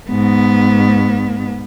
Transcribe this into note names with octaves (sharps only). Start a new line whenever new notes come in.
G#2 B3